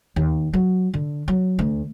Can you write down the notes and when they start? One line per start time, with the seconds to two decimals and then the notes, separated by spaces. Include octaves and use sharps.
0.16 D#2
0.54 F#3
0.94 D3
1.28 F#3
1.59 D2